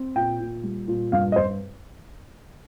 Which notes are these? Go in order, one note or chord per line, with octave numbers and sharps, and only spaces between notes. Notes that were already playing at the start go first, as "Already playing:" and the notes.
Already playing: C4
A#2 G5
A#2
G3
A#2
G2 F5
D#5
G2 C5